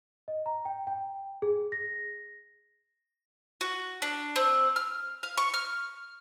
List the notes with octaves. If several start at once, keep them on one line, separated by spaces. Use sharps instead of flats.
D#5
A#5
G5
G5
G#4
A#6
F#4
D4
C4
F6
F5
C#6
F6